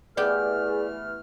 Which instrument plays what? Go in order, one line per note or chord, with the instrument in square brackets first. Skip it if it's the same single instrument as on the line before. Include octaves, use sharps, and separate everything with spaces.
[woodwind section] E3 A3 F6 [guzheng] B3 G4 G5 [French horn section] G#4 [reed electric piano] D5